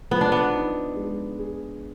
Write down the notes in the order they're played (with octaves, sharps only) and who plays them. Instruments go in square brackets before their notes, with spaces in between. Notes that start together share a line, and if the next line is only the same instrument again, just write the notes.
[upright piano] F3 [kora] B3
[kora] D4
B3
[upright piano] D#4
G#3
G#4